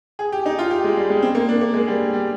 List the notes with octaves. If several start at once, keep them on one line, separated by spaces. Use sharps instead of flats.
G#4
G4
D#4
F4
G4
G#3
G3
G#3
C4
A#3
D4
A#3
G#3
G3
G3